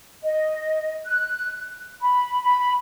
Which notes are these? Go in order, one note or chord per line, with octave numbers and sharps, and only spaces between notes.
D#5
F#6
B5
B5